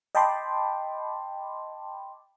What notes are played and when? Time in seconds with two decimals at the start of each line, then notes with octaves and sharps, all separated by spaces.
0.15 D#5 G5 A5 B5 C6 D6